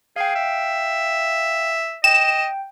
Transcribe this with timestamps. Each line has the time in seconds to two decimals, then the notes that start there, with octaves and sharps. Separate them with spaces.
0.16 G#4 F5 G5
0.35 E5
2.04 D#5 G5 E7